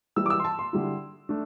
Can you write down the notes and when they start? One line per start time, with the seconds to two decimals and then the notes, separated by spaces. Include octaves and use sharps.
0.16 E3 G3 E4 E6
0.26 D6
0.30 E6
0.40 C6
0.45 A5
0.59 C6
0.73 D3 G3 E4
1.29 A3 D4